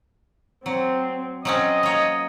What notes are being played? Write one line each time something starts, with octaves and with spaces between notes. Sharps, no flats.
F#3 C4
F#3 C4 C#4 D#5
A#3 C#5